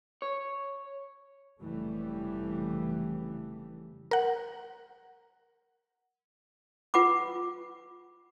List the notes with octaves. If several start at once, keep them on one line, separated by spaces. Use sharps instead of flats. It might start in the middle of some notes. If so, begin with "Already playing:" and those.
C#5
F1 C#3 E3 G3 A3
A#4 F#5
F4 B4 F#5 B5 D6